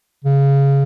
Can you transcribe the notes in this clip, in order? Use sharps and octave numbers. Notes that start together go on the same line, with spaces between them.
C#3